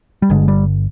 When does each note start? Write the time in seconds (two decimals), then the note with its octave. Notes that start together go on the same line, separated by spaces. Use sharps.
0.22 G3
0.30 G1 G2 D3 G#3
0.48 G3